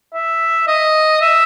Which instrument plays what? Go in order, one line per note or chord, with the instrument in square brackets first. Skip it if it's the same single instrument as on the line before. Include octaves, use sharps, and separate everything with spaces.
[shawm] E5
D#5
E5